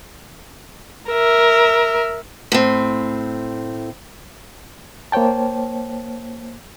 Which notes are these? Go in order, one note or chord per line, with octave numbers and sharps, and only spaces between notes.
A#4 E5
A2 C4
A#3 C5 C#5 G5 A5